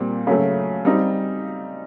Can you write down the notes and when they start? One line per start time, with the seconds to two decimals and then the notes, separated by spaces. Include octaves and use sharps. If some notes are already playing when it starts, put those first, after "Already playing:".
Already playing: A#2 G3 C4
0.27 C#3 F#3 A3
0.85 G3 C4 D#4